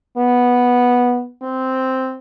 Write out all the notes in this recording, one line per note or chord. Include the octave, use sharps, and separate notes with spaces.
B3
C4